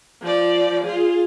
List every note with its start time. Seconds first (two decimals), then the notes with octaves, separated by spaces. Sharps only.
0.22 F3 D5
0.84 F4 G#4